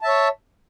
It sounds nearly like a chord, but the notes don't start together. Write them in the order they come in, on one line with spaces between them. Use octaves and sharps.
A5 E5 C#5